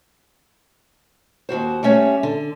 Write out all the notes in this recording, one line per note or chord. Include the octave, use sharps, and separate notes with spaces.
D#2 C3 F#4 C5
G3 A3 C#4 C#5 E5
D3